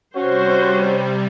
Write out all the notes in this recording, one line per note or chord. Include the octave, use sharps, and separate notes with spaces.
C3 G3 C#4 F#4 C5